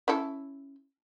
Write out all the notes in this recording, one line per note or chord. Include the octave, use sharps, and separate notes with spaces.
C#4 E4 A4